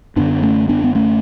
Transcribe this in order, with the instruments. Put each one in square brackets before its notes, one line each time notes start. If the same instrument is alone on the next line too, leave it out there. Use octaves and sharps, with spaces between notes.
[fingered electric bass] F#2 D3 B3 D4
A3 C#4
B3 D4
B3
A3 C#4